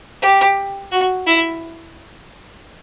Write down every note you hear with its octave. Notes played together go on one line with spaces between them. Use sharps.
G4
F#4
E4